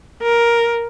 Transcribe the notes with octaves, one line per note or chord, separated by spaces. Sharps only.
A#4